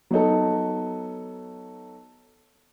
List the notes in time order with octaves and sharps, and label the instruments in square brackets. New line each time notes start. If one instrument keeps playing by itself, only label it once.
[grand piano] F#3 B3 D#4 A4